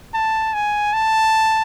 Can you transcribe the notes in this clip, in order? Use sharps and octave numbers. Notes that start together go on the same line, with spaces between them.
A5
G#5
A5